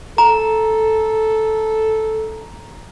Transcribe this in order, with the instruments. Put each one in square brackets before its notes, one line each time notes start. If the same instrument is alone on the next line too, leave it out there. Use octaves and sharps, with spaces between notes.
[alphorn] A4 [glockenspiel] A#5